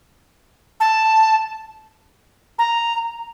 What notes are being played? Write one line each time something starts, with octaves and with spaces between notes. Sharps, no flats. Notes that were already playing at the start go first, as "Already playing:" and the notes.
A5
A#5